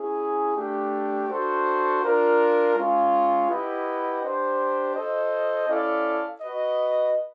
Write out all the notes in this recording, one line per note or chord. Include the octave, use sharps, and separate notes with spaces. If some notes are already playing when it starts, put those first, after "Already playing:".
Already playing: C#4 E4 G#4
A3 D4 G4
D4 F#4 A4 C5
D4 F4 A#4
G#3 C#4 F4
E4 G4 B4 D#5 F#5
D4 G4 C5
F4 A4 C5 D#5
C#4 E4 A4 D5 F5
F#4 B4 D#5